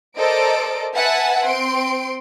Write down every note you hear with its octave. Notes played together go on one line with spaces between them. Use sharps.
A4 A#4 C5 D5 D#5 D7
B4 E5 F#5 G#5 A5
C4 C6 D7